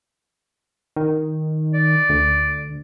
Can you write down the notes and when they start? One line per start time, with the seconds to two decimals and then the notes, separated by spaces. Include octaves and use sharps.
0.96 D#3
1.74 D5
2.09 D2